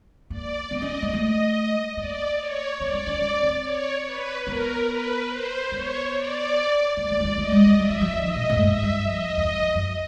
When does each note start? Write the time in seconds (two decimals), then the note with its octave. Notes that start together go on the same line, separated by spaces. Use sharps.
0.30 A#3 D5
0.71 B3 D#5
0.82 C#4
1.02 A#3
1.13 A3 D#5
1.97 A#3 D5
2.38 C#5
2.80 B3 D5
2.93 C4
3.07 C#4
3.22 C#4
3.43 C4
3.63 C#5
4.05 B4
4.46 B3 A#4
4.88 B4
5.30 C5
5.72 B3 C#5
6.13 D5
6.97 A#3 D5
7.10 A3
7.20 A3
7.24 G#3
7.31 A#3
7.38 A3 D#5
7.52 G#3
7.66 G3
7.79 G3 E5
7.90 F#3
8.01 F#3
8.11 F3
8.21 D#3 D#5
8.36 A#2
8.50 A2
8.57 G2
8.63 G#2 E5
8.83 G2
9.05 F2 D#5
9.30 E2
9.37 F2
9.46 F#2
9.60 F2
9.75 F#2